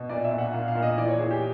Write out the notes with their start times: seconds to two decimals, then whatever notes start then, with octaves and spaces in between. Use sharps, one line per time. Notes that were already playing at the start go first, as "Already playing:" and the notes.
Already playing: B2
0.09 A#2 D5
0.24 E5
0.31 A#2
0.38 F#5
0.53 A#2 F5
0.68 F5
0.75 A#2
0.83 D#5
0.97 E3 D5
1.08 C#5
1.19 E3 G#4
1.31 G4